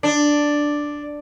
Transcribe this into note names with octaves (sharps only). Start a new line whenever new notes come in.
D4